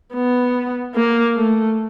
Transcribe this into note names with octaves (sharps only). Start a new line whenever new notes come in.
B3
A#3
A3